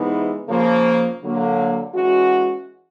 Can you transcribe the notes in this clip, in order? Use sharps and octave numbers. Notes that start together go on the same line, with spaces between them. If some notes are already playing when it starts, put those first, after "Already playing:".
Already playing: C3 E3 G#3 B3 D#4
C#3 F3 A#3
D3 F#3 A#3
E3 G#3 C#4 F#4